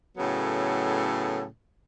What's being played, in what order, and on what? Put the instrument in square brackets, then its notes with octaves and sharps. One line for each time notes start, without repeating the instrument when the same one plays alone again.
[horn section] A2 C#3 F#3 B3 A4